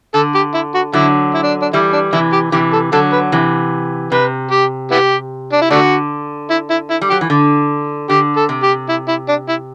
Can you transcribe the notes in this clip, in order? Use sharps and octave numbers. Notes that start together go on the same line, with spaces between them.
D3 A4
G4
E4
F#4
D3 F#3 E4
E4
D4
D4
E3 G3 E4
D4
C3 E3 E4
G4
C3 E3 G4
A4
D3 F#3 A4
B4
C3 E3
C3 B4
G4
B3 E4 G4
D4
E4
D3 A3 D4 F#4
E4
E4
E4
G3
F#3 G4
E3
D3
D3 G4
A4
C3
G4
E4
E4
D4
E4